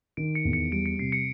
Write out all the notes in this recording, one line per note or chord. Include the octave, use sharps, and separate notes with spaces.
D#3 D7
C#7
E2
C#7
G3 D7
C#7
C3 C7
C#7